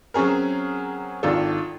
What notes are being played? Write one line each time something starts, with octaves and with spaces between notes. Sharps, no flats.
F#3 C4 C#4 G#4 A#4
G#1 D#3 D4 F4 A4